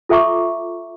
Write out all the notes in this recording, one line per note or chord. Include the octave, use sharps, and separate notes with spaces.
F4 A4 E5 A#5 C#6 D6